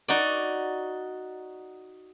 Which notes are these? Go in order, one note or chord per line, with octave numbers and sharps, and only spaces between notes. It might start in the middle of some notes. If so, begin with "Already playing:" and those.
D#4 F#4 D5